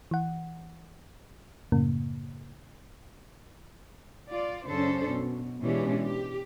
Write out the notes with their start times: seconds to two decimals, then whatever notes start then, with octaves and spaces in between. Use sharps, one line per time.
0.11 E3 F#5
1.72 F#2 A2 C#3 A#3
4.30 F4 D5
4.67 F#2 C#3 C#4 D4 A4 C5
5.06 B2
5.62 B2 E3 G#3 C#4 D4 G4
6.01 G4